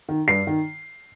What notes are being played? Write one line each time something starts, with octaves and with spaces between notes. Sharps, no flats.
D#3
G2 C7
D#3